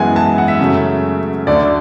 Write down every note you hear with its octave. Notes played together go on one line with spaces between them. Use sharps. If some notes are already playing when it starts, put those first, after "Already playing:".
Already playing: F#2 E3 G#3 B3 F#5 G#5
A5
A5
F#5
E5
F#2 C#3 F#3 A3
D2 D3 A3 D5